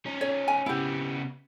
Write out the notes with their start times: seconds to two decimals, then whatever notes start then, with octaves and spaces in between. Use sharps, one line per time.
0.05 C#4 D#4
0.21 C#5
0.48 G#5
0.66 C#3 B3 E4 G4